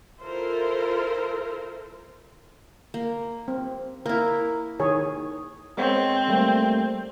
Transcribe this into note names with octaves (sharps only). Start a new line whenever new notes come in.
E4 F4 A4 A#4 C5
A#3
C4
A#3 E4 A#4
D#3 G#4 C#5
G#3 B3 C4 C#5
G3 A3 A#3